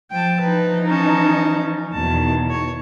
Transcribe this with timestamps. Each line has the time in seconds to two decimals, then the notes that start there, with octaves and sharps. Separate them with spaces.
0.11 F3 G5 A5
0.40 E3 F3 D#4 B4
0.88 C#4 A5
1.93 E2 B2 D#3 A5
2.50 C#5